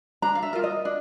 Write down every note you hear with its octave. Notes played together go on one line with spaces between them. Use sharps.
D4 A#5
F5
E5
F4 A#4
D#5
D4